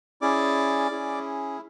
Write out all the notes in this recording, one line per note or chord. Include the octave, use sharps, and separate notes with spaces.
C#4 E4 G#4 D5 D6
C#4 E4 G#4